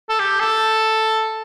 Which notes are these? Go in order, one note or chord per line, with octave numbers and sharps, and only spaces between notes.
A4
G4
A4